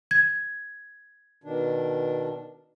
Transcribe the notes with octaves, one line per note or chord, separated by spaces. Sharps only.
G#6
B2 D#3 D4